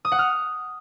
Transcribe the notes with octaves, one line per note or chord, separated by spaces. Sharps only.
D#6
F#5
F6